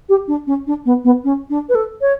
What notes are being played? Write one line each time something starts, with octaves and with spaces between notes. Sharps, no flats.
G4
D4
C#4
D4
B3
B3
C#4
D4
B4
A4
C#5